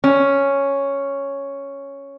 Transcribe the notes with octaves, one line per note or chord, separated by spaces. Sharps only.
C#4